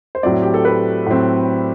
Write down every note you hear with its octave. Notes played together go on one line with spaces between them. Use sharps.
C5
A2 F#3 C4 D5
G4
A4
B4
A2 F#3 C4